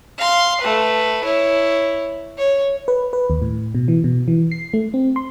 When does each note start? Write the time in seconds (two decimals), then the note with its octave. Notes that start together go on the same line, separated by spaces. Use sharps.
0.18 F5 C6
0.61 A3 B4
1.24 E4 C#5
2.38 C#5
2.88 B4
3.13 B4
3.30 D#2
3.42 A2
3.75 B2
3.88 E3
4.04 B2
4.28 E3
4.51 C7
4.74 A3
4.94 C4
5.16 C6